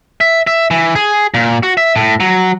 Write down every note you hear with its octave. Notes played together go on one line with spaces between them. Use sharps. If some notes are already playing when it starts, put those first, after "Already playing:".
E5
E5
E3
G#4
A#2
F#4
E5
A2
F#3